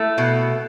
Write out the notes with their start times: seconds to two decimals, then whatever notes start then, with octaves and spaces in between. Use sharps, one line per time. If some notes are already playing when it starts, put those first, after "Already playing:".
Already playing: A3 E4
0.18 B2